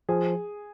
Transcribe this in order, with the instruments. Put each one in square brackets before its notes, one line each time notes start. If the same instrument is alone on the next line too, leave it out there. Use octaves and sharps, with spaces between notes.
[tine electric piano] F3 [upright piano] G#4